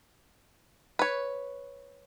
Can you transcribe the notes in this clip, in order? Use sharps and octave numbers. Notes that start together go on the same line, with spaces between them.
B4 C#5